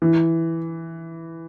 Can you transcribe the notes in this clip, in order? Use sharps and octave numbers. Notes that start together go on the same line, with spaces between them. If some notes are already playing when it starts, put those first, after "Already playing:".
E3